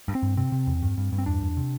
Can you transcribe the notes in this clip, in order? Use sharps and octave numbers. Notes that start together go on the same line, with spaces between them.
G2
C4
G2
C3 C4
C3
E2
G2
G2
G2
C4
E2 D4
E2
C3